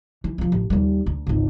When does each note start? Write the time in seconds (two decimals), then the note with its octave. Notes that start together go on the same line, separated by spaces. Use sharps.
0.24 E3
0.38 F2 F3
0.52 A1
0.70 D#2 G3
1.06 D2
1.27 G#1 C#2